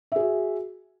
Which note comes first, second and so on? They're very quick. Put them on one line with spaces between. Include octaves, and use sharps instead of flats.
E5 G#4 F#4